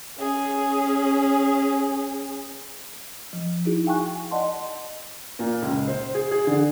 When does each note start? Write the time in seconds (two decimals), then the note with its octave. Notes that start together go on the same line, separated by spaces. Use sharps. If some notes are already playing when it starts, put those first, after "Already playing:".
0.18 C#4 G#4
3.33 F3
3.65 D#4 E4 F#4 G#4
3.86 F5 G5 G#5 C#6 F#6
4.31 D5 D#5 F#5 A5 C6
5.39 A#2
5.62 C#2
5.88 C5
6.15 G#4
6.31 G#4
6.47 D3